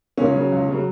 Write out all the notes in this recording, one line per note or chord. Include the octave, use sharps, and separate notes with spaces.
C#2 C#4
C#3 F#3
C#2
C#3 F#3